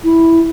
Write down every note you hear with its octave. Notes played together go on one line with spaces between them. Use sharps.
E4